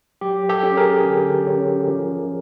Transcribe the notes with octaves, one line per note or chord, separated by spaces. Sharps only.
F#3 G4
G4 A4
C#4
G#4 A#4
D3
C#4
F3